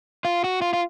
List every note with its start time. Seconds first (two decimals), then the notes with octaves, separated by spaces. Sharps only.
0.25 F4
0.44 F#4
0.62 F4
0.73 F4